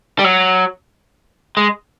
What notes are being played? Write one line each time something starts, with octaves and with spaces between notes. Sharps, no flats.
G3
F#3
G#3